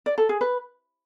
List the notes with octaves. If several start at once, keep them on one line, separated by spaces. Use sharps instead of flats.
D5
A4
G#4
B4